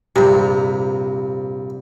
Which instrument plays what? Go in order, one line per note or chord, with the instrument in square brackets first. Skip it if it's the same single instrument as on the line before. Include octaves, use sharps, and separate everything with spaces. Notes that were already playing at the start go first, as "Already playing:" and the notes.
[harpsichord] A#1 G2 [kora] C3